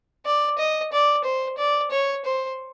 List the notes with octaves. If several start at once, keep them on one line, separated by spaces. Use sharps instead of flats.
D5
D#5
D5
C5
D5
C#5
C5